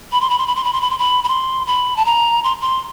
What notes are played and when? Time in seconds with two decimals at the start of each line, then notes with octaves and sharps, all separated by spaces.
0.12 B5
0.21 C6
0.30 B5
0.38 C6
0.47 B5
0.55 C6
0.64 B5
0.73 C6
0.81 B5
0.90 C6
0.98 B5
1.24 B5
1.28 C6
1.67 B5
1.97 A5
2.05 A#5
2.44 C6
2.61 C6